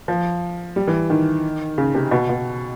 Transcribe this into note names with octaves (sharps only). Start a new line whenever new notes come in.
F3
G3
E3
D#3
C#3
C3
B2
B2